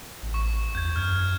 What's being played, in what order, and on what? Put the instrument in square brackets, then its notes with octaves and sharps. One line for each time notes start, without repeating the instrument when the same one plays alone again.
[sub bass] A1
[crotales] C#6
[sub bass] E2 [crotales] G6 G#6
[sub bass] F#2 [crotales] F6 G#6